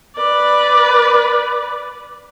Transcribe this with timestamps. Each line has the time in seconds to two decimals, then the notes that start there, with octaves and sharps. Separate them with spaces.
0.17 B4 D5